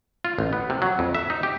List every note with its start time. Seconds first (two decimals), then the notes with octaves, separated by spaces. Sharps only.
0.25 F4
0.39 A1
0.53 B3
0.70 C3
0.82 F#3
0.99 F2
1.15 E5
1.30 D#4
1.43 G4